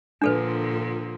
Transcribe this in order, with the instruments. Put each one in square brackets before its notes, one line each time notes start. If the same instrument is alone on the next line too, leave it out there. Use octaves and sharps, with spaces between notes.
[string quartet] A#2 D3 F3 [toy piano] D4 A4 B4